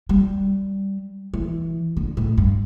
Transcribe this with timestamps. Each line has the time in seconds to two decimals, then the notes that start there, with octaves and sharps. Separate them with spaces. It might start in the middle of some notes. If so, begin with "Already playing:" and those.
0.09 G3
1.34 E3
1.97 D3
2.17 A2
2.38 G2